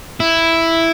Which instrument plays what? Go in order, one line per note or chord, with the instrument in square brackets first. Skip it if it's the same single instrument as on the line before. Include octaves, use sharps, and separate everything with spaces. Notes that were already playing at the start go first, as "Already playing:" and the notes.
[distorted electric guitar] E4